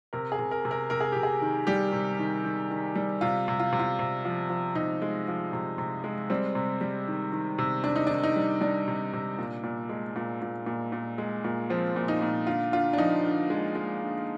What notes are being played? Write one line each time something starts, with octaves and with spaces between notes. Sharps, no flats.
C3 A#4
G#4
C3
A#4
C3
A#4
C3 A#4
G#4
C3 G4
G#4
D#3
G3 G4
C3
D#3
D#3
D#3
G3
C3 F4
C3
F4
C3
F4
C3
F3
F3
C3 D#4
G#3
F3
C3
C3
G#3
G3 C4
C3
G3
D#3
D#3
C3
C3 D4
D#4
D#3 D4
D#4
G3
G3 D4
C3
C3
A#2
A#2
G#3
A#2
A#2
A#2
A#2
G#3
A#2
F3 C4
A#2
D#4
A#2
D3 F4
D3 F4
D4
F3 D#4
D3
G#3
G#3
D3